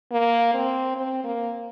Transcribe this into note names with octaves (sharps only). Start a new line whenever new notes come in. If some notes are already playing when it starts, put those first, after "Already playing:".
A#3
C4
C4
A#3